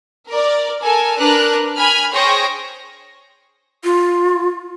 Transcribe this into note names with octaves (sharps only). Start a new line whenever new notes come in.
A#4 D5
A4 A#4 G#5
D4 A#4 B4 F#6
G#5 B5 F6
G#4 C5 C#5 G5 C#6 A#6
F4